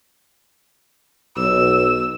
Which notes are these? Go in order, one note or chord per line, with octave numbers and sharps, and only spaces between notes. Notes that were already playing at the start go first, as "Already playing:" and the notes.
B1 E6